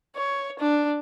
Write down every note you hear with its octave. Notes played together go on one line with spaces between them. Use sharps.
C#5
D4